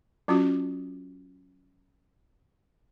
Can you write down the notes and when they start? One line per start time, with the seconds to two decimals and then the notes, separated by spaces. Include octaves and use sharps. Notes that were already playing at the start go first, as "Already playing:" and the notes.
0.28 F#3 C#4 F4 F#4